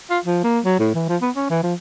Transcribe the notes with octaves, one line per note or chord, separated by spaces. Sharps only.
F4
F3
A#3
F#3
A2
E3
F3
B3
C#4
E3
F3